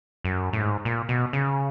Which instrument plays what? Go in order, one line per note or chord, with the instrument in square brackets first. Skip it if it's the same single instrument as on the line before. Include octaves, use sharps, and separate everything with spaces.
[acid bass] F#2
A2
G#2
A#2
B2
C#3